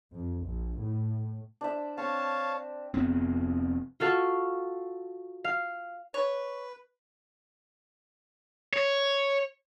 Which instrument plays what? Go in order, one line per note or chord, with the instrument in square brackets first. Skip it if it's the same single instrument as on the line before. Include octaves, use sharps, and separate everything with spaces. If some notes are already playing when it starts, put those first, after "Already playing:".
[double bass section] F2
A#1
A2
[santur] D4 C5 E5
[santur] C4 [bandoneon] C#5 F5 A5
[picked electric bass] F1 F2 B3 C4
[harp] F4 F#4 A4 F5 C#6
F5
[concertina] B4 [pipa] C#5
[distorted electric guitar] C#5